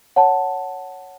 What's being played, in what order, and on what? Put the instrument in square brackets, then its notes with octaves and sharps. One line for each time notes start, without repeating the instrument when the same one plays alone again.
[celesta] C#5 F#5 A5